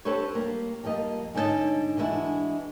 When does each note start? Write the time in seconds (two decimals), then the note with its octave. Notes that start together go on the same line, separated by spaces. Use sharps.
0.05 C4 D4 G4 A4 B4 C#5
0.35 G3 A#3
0.84 F2 G3 A#3 D#5
1.34 G#2 D3 C#4 D#4 A4 D#5
1.97 E3 G#3 D4 E4 F#4